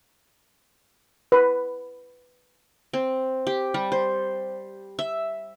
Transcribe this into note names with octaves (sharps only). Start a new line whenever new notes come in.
B4
C4
G4
G3
C5
E5